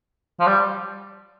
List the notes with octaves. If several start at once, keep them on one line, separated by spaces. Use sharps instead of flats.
F3
G3